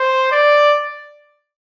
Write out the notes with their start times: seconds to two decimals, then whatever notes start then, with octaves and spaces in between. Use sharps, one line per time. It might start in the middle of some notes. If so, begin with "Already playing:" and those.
Already playing: C5
0.32 D5